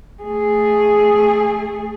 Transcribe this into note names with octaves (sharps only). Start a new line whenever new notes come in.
A3 G#4